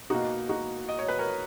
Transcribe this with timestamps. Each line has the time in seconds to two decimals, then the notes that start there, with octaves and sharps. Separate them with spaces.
0.10 B2 A#3 D#4 F#4
0.49 D#4 F#4
0.89 D#5
0.99 C#5
1.08 B4
1.19 A#4 C#5